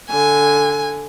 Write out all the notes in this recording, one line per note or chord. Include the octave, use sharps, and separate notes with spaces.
D3 G#5